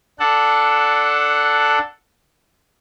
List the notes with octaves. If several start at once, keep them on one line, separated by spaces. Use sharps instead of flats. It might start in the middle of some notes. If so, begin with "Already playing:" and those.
D4 A4 F#5